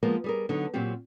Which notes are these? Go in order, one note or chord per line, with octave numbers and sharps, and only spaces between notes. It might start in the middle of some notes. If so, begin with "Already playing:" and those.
F3 G#3 A#3 B3 A#4
G3 G#4 A#4
D3 F#3 B3 D#4
A#2 F#3 C4 F4 G4